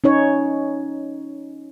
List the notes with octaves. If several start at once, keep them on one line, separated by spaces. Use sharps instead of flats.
C#4 D#4 C#5